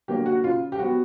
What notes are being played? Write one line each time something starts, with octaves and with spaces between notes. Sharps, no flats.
D3 F#3 A#3 G4
F#4
C#3 F4
G4
F#3 B3 F#4